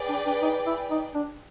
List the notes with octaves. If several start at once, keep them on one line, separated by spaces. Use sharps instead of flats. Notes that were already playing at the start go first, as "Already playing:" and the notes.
Already playing: G#4 B4 D5 G5
D4
D4
D#4
E4
D#4
D4